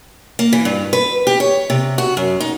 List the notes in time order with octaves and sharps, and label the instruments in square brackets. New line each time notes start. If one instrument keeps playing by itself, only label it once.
[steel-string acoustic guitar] A#3
E3
G2
B4
G4
C#5
C3
F#4
F#2
D#4